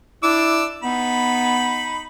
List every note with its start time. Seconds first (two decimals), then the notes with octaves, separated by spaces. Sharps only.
0.23 D4 E4 D6 E6
0.83 B3 D#4 B5